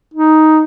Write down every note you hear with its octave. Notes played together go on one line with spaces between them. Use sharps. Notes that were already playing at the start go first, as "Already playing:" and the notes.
D#4